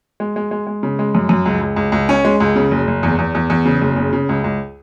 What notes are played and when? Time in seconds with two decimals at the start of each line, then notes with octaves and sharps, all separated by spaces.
0.20 G#3
0.36 G#3
0.51 G#3
0.67 G#3
0.83 C#3
0.99 G#3
1.15 F#2
1.29 F#2
1.46 C#2
1.62 C#2
1.76 C#2
1.92 C#2
2.09 C#4
2.25 G#3
2.40 C#2
2.56 C#3
2.71 F#1
2.88 F#1
3.03 E2
3.19 E2
3.35 E2
3.50 E2
3.65 C#3
3.81 F#1
3.96 C#3
4.13 C#3
4.29 C#2
4.44 C#2